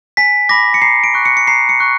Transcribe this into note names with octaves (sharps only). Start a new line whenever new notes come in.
G#5 B6
B5 D6 A#6
C#7
A#5 C7
D7
C#6 F#6
C#7
C#7
A#5 C7
C#7
C#6 F#6